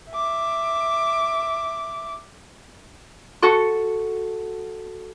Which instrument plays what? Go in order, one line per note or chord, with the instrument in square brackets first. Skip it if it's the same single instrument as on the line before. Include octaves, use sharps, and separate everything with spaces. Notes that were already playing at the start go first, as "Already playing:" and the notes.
[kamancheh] E5 D6
[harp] F#4 A4 C#6